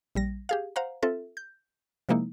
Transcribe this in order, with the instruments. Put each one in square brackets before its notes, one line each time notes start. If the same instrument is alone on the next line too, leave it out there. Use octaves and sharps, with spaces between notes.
[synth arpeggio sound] A#1 G3 A#6
G4 G#4 F5
C5 F5 F#5 A#5
C4 F4 A4 E5
G6
C3 F3 G#3 A#3 D#4 E4